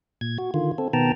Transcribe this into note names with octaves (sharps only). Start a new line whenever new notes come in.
A#2 G#6
F#4
D3 D#3 F4
C4 A4
B2 D#3 B3 G5 A5 A#5